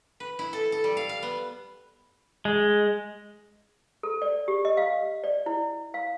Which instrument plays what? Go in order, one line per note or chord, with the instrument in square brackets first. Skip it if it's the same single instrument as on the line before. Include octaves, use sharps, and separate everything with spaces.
[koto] B4
E4
A4
A4
G3
F5
F5
B3
[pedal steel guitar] G#3
[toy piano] A4
D5
G4
D#5
F5
D5
E4
F5